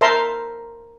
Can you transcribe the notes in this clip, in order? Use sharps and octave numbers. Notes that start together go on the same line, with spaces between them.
A#4 C5 E5 A5 A#5 C6